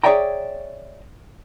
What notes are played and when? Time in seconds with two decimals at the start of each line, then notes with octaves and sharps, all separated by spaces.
0.04 G#4 C#5 D5 E5 G5 A#5